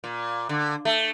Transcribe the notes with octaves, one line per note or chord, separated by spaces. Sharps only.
A#2
D3
A3